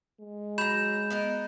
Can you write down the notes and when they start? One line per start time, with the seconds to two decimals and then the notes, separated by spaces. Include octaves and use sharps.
0.21 G#3
0.58 F#3 A#5 B5 G6 E7
1.10 B3 D#4 A#4